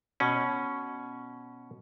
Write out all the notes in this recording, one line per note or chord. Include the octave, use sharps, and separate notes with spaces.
B2 C#4